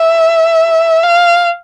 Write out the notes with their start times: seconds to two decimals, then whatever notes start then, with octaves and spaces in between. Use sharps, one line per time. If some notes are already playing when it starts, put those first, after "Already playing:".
Already playing: E5
1.03 F5